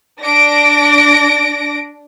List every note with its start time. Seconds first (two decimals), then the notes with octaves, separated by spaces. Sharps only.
0.20 D4 A#6 D7